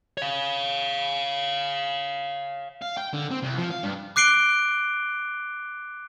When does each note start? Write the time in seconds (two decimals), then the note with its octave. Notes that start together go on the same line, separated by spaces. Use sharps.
0.17 C#5 F5
2.82 F5
2.97 G5
3.13 D3
3.31 C4
3.43 C2
3.58 F3
3.70 F5
3.83 G2
4.16 D6 F#6 C7 D7 G7